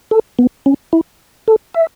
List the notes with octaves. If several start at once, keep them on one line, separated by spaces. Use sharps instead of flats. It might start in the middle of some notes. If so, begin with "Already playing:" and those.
A4
B3
C#4
E4
A4
E5